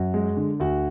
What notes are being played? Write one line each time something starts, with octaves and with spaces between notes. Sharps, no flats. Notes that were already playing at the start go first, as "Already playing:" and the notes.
Already playing: F#2 F#4
G#3
D3
D2 F#4